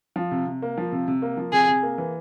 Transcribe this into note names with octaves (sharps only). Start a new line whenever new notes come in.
F3
C3
C3
A#3
F3
C3
C3
A#3
F3
C3 G#4
C3
A#3
E3